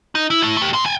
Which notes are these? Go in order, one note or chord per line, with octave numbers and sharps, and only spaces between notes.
D#4
E4
A3 E4
A3 G4
A#2 C6
G5 G#5